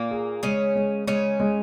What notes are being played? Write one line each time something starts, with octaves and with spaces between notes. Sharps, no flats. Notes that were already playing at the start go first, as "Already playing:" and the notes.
Already playing: A#2 A#3
G#4
C#3 G#3 C#4
G#3
C#3 G#3 C#4
G#3